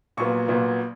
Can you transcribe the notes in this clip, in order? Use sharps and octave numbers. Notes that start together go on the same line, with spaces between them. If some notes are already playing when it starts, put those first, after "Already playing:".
A#1 A#2 F#3 B3 C#6
A#1 A#2 F#3 B3